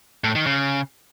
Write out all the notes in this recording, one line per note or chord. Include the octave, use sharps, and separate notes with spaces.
A2
D#3
C#3